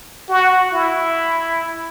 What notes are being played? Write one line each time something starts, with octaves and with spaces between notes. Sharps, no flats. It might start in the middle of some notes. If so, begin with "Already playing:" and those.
F#4
E4